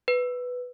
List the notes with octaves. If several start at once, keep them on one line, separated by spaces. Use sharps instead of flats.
B4